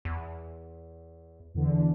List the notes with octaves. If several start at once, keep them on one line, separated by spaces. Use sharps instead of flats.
E2
E2 D3